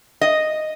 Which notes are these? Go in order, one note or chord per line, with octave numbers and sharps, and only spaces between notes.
D#5